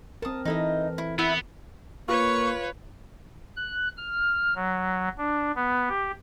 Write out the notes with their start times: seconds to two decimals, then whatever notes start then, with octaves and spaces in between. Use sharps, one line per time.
0.22 C4 A#4 A5 D#6
0.45 E3 D#4 E4 A4 D#5
0.98 E4
1.19 B3 E4 F#5
2.08 A#3 F4 B4 C#5 C#6
3.57 F#6
3.97 F6
4.55 F#3
5.18 D4
5.56 B3
5.89 G4